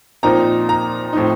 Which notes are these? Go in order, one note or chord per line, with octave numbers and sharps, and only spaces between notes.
A#2 F3 C4 D#4 A#5
A#5
A2 F3 C4 D#4